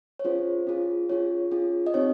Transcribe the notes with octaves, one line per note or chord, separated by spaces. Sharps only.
C#5
C#4 F4 G#4 C5
C#4 F4 G#4
C#4 F4 G#4 C#5
C#4 F4 G#4
D#5
C4 D#4 G4 C#5